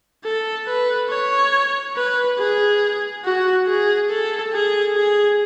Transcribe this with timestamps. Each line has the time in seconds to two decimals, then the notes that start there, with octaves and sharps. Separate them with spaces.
0.25 A4
0.67 B4
1.10 C#5
1.96 B4
2.38 G#4
3.25 F#4
3.67 G#4
4.10 A4
4.52 G#4
4.96 G#4